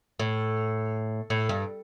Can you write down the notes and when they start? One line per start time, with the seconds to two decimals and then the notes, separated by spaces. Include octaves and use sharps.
0.19 A2
1.30 A2
1.49 G2